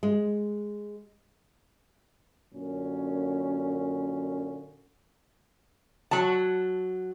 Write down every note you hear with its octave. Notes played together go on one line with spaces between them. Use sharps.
G#3
F#2 A#2 D3 C#4
F#3 A5